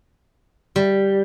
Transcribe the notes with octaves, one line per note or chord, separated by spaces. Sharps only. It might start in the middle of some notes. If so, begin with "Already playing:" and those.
G3